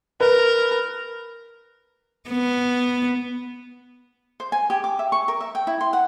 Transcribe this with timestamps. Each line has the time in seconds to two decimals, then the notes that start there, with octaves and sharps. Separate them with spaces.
0.20 A#4 B4
2.30 B3
4.40 C5
4.52 G#5
4.70 G4
4.84 D6
4.99 E5
5.12 C#6
5.28 A#4
5.41 E5
5.55 G5
5.67 E4
5.81 C6
5.93 F#5